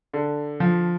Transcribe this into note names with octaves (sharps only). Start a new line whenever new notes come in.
D3
F3